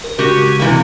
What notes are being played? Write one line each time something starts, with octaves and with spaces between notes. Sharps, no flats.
A#4
C#3 G#3 F#4 G4
C3 E3 A#3